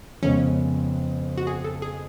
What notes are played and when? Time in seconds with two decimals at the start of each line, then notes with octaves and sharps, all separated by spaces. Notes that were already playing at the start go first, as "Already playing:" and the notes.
0.23 F2 C#3 G#3 B3 C#4
1.37 F#4
1.47 G#4
1.64 A4
1.82 G#4